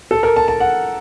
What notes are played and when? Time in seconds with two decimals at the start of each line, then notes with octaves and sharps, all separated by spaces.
0.11 A4
0.23 A#4
0.36 A5
0.48 A5
0.60 F#5